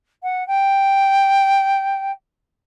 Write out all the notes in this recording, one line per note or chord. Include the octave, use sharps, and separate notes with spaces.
F#5
G5